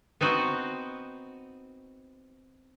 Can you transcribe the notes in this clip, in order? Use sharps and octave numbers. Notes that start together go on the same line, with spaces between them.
B3 C4 D#4 F#4